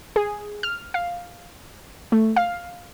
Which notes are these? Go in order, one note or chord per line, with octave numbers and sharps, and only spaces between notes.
G#4
F6
F5
A3
F5